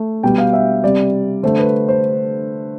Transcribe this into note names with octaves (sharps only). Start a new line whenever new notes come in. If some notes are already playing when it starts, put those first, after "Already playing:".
Already playing: A3
B2 G3 G5
F5
E5
C3 G3 D5
D3 A3 C5
B4
C5